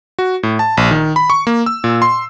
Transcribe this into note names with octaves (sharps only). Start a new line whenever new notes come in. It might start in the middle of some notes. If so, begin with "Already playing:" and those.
F#4
A2
A5
A#1
D#3
B5
C#6
A#3
E6
A#2
C6